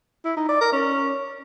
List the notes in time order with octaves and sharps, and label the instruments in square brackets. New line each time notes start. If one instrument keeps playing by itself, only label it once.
[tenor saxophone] E4
D#4
D5
A#4
C#4